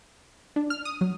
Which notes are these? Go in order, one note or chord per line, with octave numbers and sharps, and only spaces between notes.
D4
F6
D#6
F#3